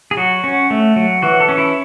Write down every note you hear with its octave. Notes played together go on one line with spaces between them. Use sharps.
G#4
F#3 F#4
C#4
A3
F#3
E3 F#4
A4
C#4
E4